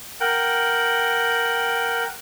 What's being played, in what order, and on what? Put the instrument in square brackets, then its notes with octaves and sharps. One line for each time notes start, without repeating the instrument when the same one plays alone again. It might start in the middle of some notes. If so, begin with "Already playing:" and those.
[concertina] A#4 F#5 G5